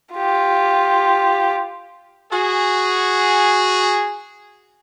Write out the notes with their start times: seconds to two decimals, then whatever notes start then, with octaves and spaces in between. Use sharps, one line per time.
0.14 F4 G4
2.32 F#4 G#4